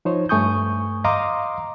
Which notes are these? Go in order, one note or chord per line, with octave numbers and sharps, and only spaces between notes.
F3 D#4 C5 C#5
G2 A3 G#5 C#6 D#6 G6
D#5 F5 A#5 C6 D6 D#6